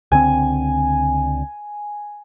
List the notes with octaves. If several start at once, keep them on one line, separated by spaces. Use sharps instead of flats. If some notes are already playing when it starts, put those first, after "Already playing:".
C#2 D3 C4 G#5